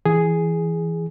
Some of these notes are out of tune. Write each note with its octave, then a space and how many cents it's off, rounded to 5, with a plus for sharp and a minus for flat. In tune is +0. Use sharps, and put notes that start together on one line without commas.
E3 +0 G#4 +0